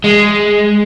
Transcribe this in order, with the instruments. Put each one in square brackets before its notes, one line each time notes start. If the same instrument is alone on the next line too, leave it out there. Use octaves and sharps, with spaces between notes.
[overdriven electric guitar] G#3